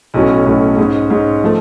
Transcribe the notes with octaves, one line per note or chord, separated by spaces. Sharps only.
B1 A2 F#3 A3 C#4
B1 A2 F#3 A3 C#4
G#2 G#3 C#4
G#2 G#3 C#4
F3 A3